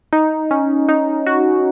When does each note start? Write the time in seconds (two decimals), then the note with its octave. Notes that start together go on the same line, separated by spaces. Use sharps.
0.13 D#4
0.51 C#4
0.89 D#4
1.26 F#4